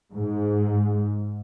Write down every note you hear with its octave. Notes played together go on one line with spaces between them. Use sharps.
G#2